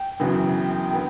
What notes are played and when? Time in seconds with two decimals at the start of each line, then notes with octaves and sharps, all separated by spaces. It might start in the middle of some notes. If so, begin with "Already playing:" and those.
Already playing: G5
0.20 F#2 C#3 E3 B3 F#4
0.93 D3 B3